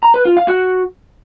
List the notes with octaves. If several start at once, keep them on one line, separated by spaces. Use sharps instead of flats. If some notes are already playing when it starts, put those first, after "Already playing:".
A#5
B4
F4
F5
F#4